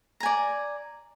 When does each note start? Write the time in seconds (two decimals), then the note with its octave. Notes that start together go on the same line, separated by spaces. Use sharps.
0.20 A#5
0.23 G#5
0.26 D5